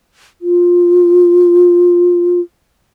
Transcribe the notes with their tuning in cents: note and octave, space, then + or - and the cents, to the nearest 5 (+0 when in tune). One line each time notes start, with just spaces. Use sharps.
F4 +10